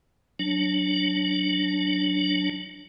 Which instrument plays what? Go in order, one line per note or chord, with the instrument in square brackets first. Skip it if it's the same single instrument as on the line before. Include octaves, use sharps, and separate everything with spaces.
[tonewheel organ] F#3 D4